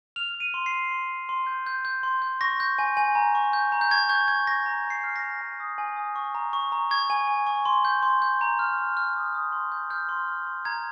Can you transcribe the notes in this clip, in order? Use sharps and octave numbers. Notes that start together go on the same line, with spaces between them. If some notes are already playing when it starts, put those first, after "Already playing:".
F6 F7
F6
D#7
C6
C7
C6
C6
C6
C6
G6
G6
G6
C6
G6
C#6 A#6
G6
G#5
G#5
A#5
C#6
G6
A#5
G6
C#6 G#6
C#6 G6
C#6 G#6
C#6 A#6
A#5
A#5
C7
F6
A#6
A#5
G#5
D#6
G#5
D#6
C#6
A#5
C#6
A#5
C#6 G#6
G#5
G#5
C#6
C6
G6
C6
G6
A#5
F6
F6
F6
D#6
D#6
C6
G6
F6 G6
C6
F6
C6
A#5 G#6